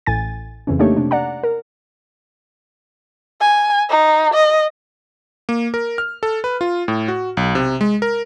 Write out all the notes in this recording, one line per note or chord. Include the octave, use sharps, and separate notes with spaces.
A1 A2 G#5 A6
F2 C#3 E3 C#4
A3 A#3 D4 D#4 G4 C#5
C3 D4
D5 F#5 A#5
A#4
G#5
D#4
D#5
A#3
A#4
F6
A4
B4
F4
A2
F#4
B1
C3
G#3
A#4